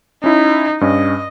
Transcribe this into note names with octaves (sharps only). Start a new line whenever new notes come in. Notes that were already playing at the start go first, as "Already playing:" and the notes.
C#4 D#4 E4
G2 C#4 D#5